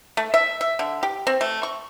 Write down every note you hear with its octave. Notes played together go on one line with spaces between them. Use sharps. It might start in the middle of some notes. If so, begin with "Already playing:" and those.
A3
E5
E5
D3
G4
C4
A3
C#6